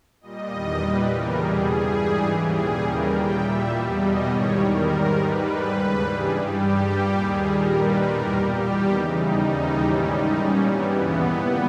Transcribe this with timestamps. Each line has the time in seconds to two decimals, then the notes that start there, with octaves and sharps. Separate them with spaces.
0.21 A#2 G3 D#5
0.50 E2 D#3 G3 D#5
0.79 A#2 G3 B4
1.07 E2 C#3 E3 G3 A#4
1.37 E2 B2 G3 G#4
1.66 G2 G3
1.95 G#2 E3 G3
2.24 D#2 C#3 E3 G4
2.53 A#2 G3 G#4
2.82 D#2 C#3 E3 G3 A#4
3.11 A#2 G3 G5
3.40 A#2 G3 E5
3.70 E2 B2 G3
3.98 E2 B2 G3 D#5
4.27 G#2 D#3 G3 C#5
4.56 E2 D#3 G3 A#4
4.85 G#2 D#3 G3
5.14 G#2 G3 B4
5.43 G#2 G3 B4
5.72 D#2 C#3 G3
6.01 G2 E3 G3 G#4
6.31 G2 G3 G4
6.60 G2 G3
6.88 A#2 G3
7.18 D#2 D#3 G3 G#4
7.47 A#2 G3 A#4
7.75 G2 D#3 G3 B4
8.05 E2 B2 G3 A#4
8.33 A#2 G3 G4
8.63 E2 D#3 G3
8.92 E2 C#3 E3 D#4
9.21 D#2 C#3 G3 D#4
9.51 D#2 C#3 E3 G3
9.79 G#2 E3 G3 C#4
10.08 G#2 D#3 G3 D#4
10.37 A#2 G3 C#4
10.66 G2 E3 G3 B3
10.95 D#2 C#3 E3
11.24 A#2 G3